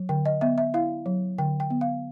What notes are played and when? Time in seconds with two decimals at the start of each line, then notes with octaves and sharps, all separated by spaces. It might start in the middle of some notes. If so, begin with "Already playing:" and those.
Already playing: F#3
0.09 D3 G5
0.26 D#5
0.41 B3 E5
0.58 E5
0.74 E4 F5
1.06 F#3
1.38 D3 G5
1.60 G5
1.70 B3
1.81 F5